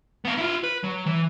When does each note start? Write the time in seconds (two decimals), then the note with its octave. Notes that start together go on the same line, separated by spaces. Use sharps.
0.25 B3 F5
0.38 E4 F4
0.64 B4
0.83 F#3
1.06 E3